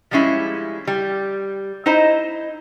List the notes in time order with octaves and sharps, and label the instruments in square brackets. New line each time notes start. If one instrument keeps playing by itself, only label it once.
[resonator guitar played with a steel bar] F3 G3 G#3 C#4 E4
G3
D#4 E4 C5 D#5